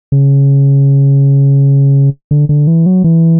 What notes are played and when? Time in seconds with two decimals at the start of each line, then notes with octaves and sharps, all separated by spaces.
0.12 C#3
2.31 D3
2.49 D3
2.67 E3
2.86 F#3
3.04 E3